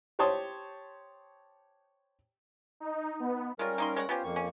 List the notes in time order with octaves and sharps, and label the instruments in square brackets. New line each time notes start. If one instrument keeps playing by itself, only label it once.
[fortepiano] G4 C5 C#5 A5 C6 D#6
[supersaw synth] D#4
B3
[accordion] G3 C#4 A#4 [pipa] G#3 F4
[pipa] A#3 D#4 C6
G#3 C#5 F#5
[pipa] B3 C#4 G4 [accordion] F4 C5
[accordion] F2 A#3 C#6
[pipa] C#4